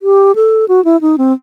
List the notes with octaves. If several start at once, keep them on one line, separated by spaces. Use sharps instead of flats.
G4
A4
F#4
E4
D#4
C4